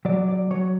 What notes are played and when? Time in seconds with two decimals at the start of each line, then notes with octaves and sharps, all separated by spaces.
0.05 F#3 D5
0.28 D5
0.51 F#3 C#5